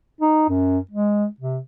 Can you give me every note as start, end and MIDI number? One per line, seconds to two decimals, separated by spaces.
0.21 0.47 63
0.49 0.79 42
0.91 1.26 56
1.40 1.58 48